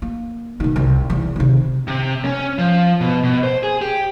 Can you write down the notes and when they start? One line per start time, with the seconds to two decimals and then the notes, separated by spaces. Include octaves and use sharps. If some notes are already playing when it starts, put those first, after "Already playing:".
0.02 A#3
0.60 B2 D#3
0.76 C2
1.10 E2
1.36 C3 D#3
1.88 C3
2.25 C#4
2.59 F3
3.01 B2
3.24 B2
3.43 C5
3.63 G#4
3.82 G4